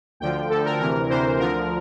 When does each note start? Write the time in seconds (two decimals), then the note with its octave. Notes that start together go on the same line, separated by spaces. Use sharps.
0.20 D2 D3 F3 G5
0.50 D2 D3 F3 A4
0.65 A#4
0.80 D2 C3 E3 A#4
1.09 D2 C3 E3 C5
1.39 D2 D3 F3 A#4